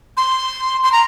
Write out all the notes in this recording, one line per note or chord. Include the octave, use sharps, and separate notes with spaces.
C6
C6
A#5